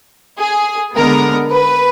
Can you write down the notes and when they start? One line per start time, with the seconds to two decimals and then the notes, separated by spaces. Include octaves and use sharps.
0.39 G#4
0.94 D3 G#3 B3 A#4
1.49 B4